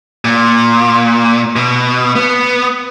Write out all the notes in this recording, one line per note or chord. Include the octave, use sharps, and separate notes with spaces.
A#2
B2
B3